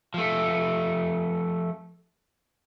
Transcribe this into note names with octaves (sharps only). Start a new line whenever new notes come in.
F3 A3